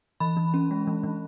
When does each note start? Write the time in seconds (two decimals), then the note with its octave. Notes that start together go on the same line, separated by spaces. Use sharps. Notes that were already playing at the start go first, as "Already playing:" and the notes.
0.20 E3 B5
0.37 E3
0.54 C#4
0.71 G#3
0.87 E3
1.03 E3